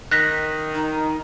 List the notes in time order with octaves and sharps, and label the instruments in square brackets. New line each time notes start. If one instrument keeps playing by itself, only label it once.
[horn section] D#3 [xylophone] F#6 A#6 B6
[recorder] D#4